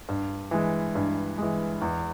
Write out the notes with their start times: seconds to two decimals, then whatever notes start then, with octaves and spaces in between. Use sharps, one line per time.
0.09 G2
0.51 E3 G#3
0.95 G2
1.38 E3 G#3
1.82 E2